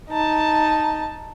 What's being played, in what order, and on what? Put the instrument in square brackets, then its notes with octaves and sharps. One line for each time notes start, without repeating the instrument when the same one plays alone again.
[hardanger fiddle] D#4 A5